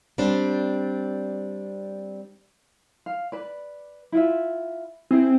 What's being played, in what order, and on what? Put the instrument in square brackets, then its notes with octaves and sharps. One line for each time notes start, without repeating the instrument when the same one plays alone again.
[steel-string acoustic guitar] G3 C4 D4
[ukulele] F5
B4 D5
E4 F4 E5
[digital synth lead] C4 [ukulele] E4 G#4